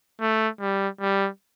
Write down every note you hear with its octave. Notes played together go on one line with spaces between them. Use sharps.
A3
G3
G3